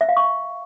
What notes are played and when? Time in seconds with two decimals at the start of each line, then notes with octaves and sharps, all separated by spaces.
0.01 E5
0.09 F5
0.17 C#6